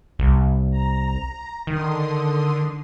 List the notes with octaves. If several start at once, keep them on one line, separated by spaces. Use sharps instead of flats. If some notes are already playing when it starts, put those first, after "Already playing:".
C2
A#5
D3 D#3 C6 D#6